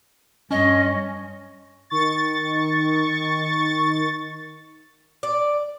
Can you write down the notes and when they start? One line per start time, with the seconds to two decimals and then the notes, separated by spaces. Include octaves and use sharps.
0.51 G2 C#4 D#5
1.90 D#3 C#6 A6
5.23 D5